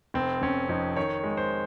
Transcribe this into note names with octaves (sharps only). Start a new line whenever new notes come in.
F1 C4
F1 C#4
F2 D#4
D#3 C#5
G#3
C5